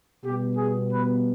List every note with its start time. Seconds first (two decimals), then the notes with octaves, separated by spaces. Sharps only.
0.25 B2 G3 B3 G4
0.58 G#4
0.91 B4